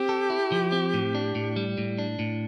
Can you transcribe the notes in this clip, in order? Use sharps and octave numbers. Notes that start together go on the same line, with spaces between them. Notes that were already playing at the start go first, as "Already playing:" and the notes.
Already playing: C4 G4
A4
E4
F3
C4
A2
D4
A2
G3
A2
D4
A2